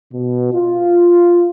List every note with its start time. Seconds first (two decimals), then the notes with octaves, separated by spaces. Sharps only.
0.12 B2
0.52 F4